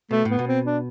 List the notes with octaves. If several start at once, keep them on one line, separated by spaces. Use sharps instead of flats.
B2 A3
A2 B3
B2
C4
D4